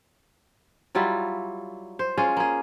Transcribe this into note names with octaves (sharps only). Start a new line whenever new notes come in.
F#3 G3 E4 F4
C5
G#3 C#4 F4 G#4
A#3 G#4